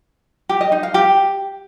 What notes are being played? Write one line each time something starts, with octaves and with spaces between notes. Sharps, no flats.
G4
D#5
D#4
F5
G4